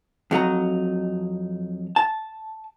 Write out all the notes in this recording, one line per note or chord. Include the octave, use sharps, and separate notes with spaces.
F2 F#3 D#4 A#5
A5